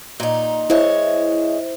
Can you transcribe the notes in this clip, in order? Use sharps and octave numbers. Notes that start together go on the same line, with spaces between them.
A#2 D#4
G#3 E4 C5 C#5 E5